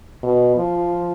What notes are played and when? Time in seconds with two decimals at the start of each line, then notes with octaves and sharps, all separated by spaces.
0.23 B2
0.57 F3